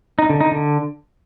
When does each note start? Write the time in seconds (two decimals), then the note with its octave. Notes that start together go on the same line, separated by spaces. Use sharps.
0.19 D#4
0.30 D3
0.41 D#4
0.52 D3